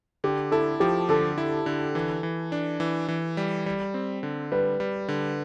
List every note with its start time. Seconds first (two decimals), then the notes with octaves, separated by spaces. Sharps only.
0.24 D3 G4
0.52 E4 A4
0.80 F3 G4
1.09 D3 A4
1.38 E4
1.66 D3
1.95 E3
2.23 E3
2.52 D4
2.80 E3
3.08 E3
3.37 G3
3.66 G3
3.94 C4
4.23 D3
4.52 G3 B4
4.80 G3
5.08 D3